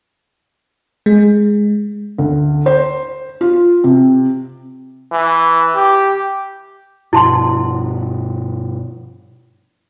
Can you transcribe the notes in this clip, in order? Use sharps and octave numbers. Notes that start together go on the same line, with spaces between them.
G#3
D2
C5
F4
C3
E3
G4
G2 B2 F3 E4 A5 C6